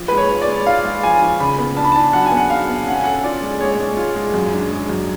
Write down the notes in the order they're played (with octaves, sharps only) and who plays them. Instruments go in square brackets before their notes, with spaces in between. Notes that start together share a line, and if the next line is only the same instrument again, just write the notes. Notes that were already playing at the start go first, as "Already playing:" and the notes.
Already playing: [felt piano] F3
[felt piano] G#3 [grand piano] B4
[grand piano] C#5
[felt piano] F4
[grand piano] D5
[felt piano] G#3
[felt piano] F4 [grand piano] F5
[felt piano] G#3
[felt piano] F3 [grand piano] G#5
[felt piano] F3
[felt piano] C#3 [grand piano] B5
[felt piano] B3
[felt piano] D4 [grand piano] A5
[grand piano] B5
A5
[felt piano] D4
[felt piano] F#3 [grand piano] F#5
[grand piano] G#5
[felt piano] B3
[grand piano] F#5
[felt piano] F#3 [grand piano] F5
[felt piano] B3
[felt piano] C#4 [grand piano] F#5
[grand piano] G#5
[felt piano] A4 [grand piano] F#5
[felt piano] F4 [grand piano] D5
[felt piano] G#3
[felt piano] G#3 [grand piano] C#5
[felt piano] G#3
F4
G#3
F#2
D4
G#3
F#2